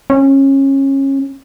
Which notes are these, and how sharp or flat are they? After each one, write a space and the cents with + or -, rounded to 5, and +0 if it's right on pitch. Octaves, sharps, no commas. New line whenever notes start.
C#4 -25